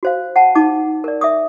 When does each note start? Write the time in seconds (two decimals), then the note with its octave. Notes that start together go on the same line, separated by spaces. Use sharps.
0.03 F#4 C5 F5
0.36 F#5 A5
0.55 D#4 A5 D6
1.04 A#4 D5
1.21 E5 D6 D#6